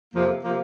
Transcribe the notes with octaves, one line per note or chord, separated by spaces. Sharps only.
F2 C3 F3 A#3
C3 F3 A#3